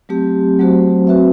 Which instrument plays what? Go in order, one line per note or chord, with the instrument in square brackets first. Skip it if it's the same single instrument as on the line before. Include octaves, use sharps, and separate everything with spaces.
[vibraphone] F#3 A3 C4 G4
F#3 A3 C4 F#4 C5
C4 F#4 B4 E5